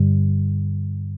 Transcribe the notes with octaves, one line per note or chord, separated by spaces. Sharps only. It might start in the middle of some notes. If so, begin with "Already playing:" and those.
Already playing: G2 D3 G3